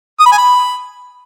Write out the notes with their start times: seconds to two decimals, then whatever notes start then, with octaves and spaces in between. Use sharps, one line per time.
0.20 D#6
0.26 B5
0.32 G#5
0.38 B5